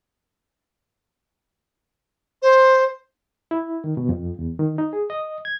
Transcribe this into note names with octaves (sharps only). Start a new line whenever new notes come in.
C5
E4
D#3
B2
F2
E2
D#3
D#4
G#4
D#5
G#6